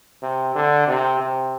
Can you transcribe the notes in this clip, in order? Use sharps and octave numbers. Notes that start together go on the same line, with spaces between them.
C3
D3
C3
C3